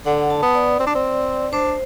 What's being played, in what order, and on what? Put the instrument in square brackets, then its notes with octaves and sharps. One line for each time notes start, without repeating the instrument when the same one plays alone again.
[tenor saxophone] D3 [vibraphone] F#5
[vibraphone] A5
[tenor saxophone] B3
[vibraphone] D5
[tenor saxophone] C4
D4
C4
[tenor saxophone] D4 [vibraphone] C5